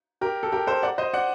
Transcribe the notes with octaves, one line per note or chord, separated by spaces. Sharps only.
G4 A#4
A4
G4 A#4
A4 C5
D5 F#5
C5 D#5
D5 F#5